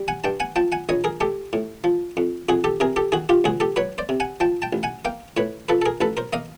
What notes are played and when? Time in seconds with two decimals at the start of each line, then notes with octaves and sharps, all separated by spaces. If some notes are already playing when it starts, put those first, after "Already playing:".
Already playing: G3
0.08 F#5 G#5
0.24 G2 G5 A5
0.40 F#5 G#5
0.56 F3 G5 A5
0.72 F#5 G#5
0.89 A#1 C#5 D#5
1.04 G#4 A#4
1.20 G#3 G4 A4
1.53 A2
1.84 F3
2.17 F2
2.49 F2 F#4 G#4
2.64 G4 A4
2.80 C3 G#4 A#4
2.96 G4 A4
3.12 D#3 F#4 G#4
3.29 F4 G4
3.44 C#2 F#4 G#4
3.60 G4 A4
3.76 F#3 B4 C#5
3.98 C5 D5
4.09 C3
4.20 F#5 G#5
4.40 F3 G5 A5
4.62 G5 A5
4.73 A1
4.83 F#5 G#5
5.05 A#3 F5 G5
5.37 A2 B4 C#5
5.69 F3 A4 B4
5.82 A4
5.86 G#4 A#4
6.01 A1 A4 B4
6.17 A#4 C5
6.33 A#3 D#5 F5